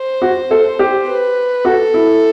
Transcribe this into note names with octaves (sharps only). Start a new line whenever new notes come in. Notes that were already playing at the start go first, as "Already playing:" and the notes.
Already playing: C5
F#4
A4
G4
B4
F#4 A4
E4